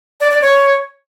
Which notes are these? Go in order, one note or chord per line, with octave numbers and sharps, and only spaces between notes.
D5
D5
C#5